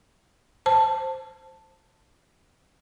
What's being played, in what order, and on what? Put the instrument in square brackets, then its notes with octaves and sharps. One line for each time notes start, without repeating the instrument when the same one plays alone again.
[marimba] C5 A5